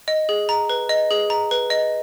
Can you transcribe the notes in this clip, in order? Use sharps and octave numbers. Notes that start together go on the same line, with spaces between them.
D#5
G#4
A#5
B4
D#5
G#4
A#5
B4
D#5